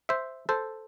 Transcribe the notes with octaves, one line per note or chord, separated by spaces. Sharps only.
C5 E5
A4 C5